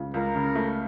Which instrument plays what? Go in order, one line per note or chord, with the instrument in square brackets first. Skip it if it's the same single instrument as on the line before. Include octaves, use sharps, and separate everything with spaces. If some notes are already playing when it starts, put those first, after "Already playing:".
Already playing: [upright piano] C#2 C#3
[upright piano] C#2 [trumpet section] A#4
[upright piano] C#3
A3